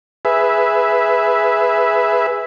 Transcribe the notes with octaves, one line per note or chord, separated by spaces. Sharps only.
G#4 B4 E5